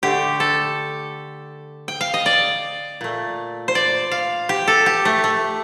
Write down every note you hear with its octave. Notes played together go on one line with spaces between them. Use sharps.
D3 A3 G4
A4
G5
F5
D#5
D5
A#2 A3
C5
D5
F5
G4
A4
G4
A3
A3